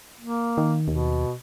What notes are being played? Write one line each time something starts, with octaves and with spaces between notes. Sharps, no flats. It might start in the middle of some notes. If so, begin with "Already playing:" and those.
A#3
D#3
D#2 B2